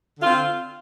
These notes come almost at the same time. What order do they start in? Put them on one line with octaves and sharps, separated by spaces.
D3 F4 C4